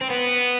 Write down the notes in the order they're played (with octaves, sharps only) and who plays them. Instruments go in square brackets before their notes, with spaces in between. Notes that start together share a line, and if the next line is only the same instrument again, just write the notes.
[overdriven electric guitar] C4
B3